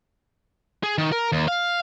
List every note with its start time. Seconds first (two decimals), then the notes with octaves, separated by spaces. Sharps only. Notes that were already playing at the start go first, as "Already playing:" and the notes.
0.83 G#4
0.98 D#3
1.12 A#4
1.32 D#2
1.48 F5